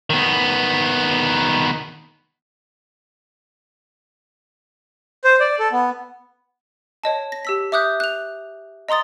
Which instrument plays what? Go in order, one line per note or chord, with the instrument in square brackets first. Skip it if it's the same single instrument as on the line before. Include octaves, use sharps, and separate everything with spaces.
[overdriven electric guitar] D#3 B3
[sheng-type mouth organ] C5
D5
A4
B3
[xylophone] C#5 D#5 A5
A#6
G4 E6 B6
E5 D6 D#6 F#6 G6
F#6 F7
D#5 A#5 C6 D#6 A6